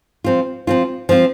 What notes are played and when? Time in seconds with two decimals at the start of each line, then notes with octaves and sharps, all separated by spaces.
0.24 F3 C4 F4
0.67 F3 C4 F4
1.09 F3 C4 F4